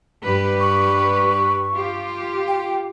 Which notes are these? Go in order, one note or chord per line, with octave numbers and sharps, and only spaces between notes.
G2 G4 B4
C#6
F4 G4
G5